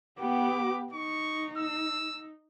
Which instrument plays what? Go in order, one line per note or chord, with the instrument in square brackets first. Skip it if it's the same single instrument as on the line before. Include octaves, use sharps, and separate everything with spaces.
[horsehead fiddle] B3 G4 [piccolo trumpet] D6
[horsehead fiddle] D#4 [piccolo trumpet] C#6
[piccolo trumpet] E6